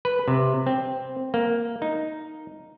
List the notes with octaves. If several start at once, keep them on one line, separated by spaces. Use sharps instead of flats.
B4
C3
C4
A#3
D#4